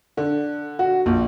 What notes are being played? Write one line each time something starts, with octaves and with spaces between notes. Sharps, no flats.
D3
F#4
A#1